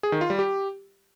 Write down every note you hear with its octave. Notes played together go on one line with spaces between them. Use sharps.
G#4
D#3
F4
G3
G4